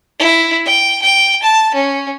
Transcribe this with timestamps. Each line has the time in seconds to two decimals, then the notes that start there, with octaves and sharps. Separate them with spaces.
0.19 E4
0.65 G5
1.02 G5
1.43 A5
1.74 C#4